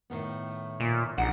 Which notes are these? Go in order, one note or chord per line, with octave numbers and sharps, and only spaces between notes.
A2 D#3 B3
A#2
A#1 G#3 D#4 F#5